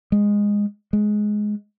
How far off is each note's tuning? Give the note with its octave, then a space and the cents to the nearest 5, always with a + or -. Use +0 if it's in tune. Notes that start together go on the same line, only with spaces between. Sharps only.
G#3 -15
G#3 +10